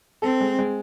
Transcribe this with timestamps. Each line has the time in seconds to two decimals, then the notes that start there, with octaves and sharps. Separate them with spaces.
0.22 C4 A4
0.41 G#3
0.59 G#3